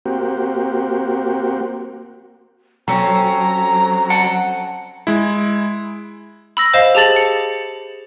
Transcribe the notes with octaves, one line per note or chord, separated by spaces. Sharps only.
A#3 C4 F#4 G4
F#3 C4 C#4 A4 A#5
F#5 A5
G#3 E4
B5 E6 A#6
C5 D#5 F5 E7
G4 G#4 A5 A6 F#7
C#7